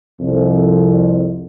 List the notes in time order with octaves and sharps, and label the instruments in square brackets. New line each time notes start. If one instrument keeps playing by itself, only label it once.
[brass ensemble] C2 F2